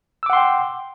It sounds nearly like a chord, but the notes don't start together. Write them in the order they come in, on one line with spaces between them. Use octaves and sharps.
E6 D6 F#5 C6 G5